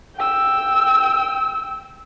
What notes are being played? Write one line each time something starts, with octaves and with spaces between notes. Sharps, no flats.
G5 E6